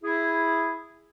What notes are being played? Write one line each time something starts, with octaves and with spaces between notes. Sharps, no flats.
E4 G#4